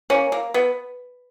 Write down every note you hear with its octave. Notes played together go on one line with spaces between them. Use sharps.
A#3 C#4
A#3
B3